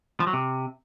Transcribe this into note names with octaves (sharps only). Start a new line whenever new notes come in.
F3
F#3
C3